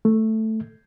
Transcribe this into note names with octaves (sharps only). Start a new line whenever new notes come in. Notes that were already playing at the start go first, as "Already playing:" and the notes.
A3